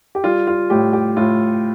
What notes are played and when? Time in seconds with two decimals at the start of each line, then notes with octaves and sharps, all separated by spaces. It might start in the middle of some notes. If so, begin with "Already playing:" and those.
0.15 G4
0.24 G3 F4
0.47 F4
0.70 A2 G4
0.93 G4
1.16 A2 F4